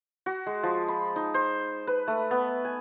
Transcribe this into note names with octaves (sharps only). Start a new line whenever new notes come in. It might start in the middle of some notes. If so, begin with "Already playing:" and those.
F#4
G#3
F3
B5
D#4
C5
B4
A3
B3
G#5